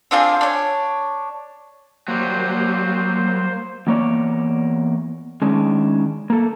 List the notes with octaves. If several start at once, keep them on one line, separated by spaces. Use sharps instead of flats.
C4 D4 F4 G#4
D4 C#5
F#3 G3 A#3 C5
E2 A#3 C#5 D5
D#3 G#3 C#4 D4
A#3 A4